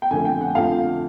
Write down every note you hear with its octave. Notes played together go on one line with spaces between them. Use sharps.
G5
F2 D3 F3 A3 G#5
G5
F#5
F2 D3 F3 A3 F5